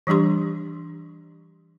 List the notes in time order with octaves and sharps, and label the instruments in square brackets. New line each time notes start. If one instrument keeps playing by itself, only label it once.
[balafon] E3 G3 D4 G4 C6